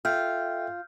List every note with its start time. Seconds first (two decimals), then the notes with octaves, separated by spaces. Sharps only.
0.05 F4 A4 E5 G5 F6 G6